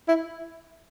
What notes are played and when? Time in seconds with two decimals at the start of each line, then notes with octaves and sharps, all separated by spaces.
0.08 E4